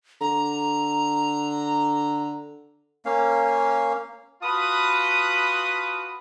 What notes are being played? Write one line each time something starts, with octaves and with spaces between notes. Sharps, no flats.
D3 A#5
A#3 C#4 F5
F4 F#4 B4 A5 B5 D#6